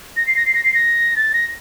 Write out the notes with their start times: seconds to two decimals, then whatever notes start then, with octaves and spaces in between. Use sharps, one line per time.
0.16 A#6
0.27 C7
0.36 A#6
0.46 C7
0.55 A#6
0.64 C7
0.74 A#6
1.16 A6
1.33 A#6